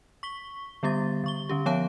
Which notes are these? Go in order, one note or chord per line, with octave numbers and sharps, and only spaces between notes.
C#6 B6 G7
D3 G3 B3 G4 A6
D3 C#6 G7
D3 C#4 G4
F3 B3 C#5 F5 A5 D7